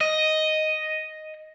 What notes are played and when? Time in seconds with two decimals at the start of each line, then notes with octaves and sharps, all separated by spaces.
0.01 D#5